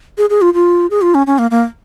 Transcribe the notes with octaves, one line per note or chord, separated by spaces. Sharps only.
G#4
G#4
F4
F4
G#4
F4
C#4
C#4
A#3
A#3